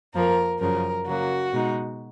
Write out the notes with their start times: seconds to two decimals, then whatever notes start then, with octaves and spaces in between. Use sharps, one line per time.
0.14 F2 F3 A#3 A#4
0.60 F#2 C#3 F3 A#4
1.07 C#3 F#3 A#3 F#4
1.52 B2 G#3 D#4